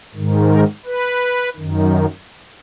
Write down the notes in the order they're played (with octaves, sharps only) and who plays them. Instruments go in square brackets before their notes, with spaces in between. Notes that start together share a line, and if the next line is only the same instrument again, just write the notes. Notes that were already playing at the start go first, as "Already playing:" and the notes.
[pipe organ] G#2 D#3
A#4
B4
F#2 D#3